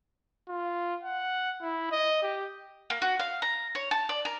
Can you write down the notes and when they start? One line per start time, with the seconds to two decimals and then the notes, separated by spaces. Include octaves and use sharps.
0.48 F4
1.04 F#5
1.62 E4
1.91 D#5
2.23 G4
2.90 A#3
3.02 F#4
3.19 F5
3.42 A#5
3.75 C#5
3.91 A5
4.09 D5
4.25 A#4